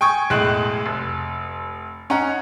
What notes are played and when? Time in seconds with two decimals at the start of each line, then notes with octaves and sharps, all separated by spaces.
0.01 G5 G#5 C#6 D#6 G#6
0.30 B1 A2 G#3 F#6 F#7
0.86 F1
2.10 C#4 D#4 F#5 A#5